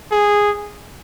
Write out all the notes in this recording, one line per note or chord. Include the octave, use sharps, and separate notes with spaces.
G#4